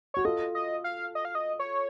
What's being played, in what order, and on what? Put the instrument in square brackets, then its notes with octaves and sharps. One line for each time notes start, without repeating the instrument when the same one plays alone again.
[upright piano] F#4 [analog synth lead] C#5
[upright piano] F4 A4 [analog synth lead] D#5
[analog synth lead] D#5
F5
D#5
F5
D#5
C#5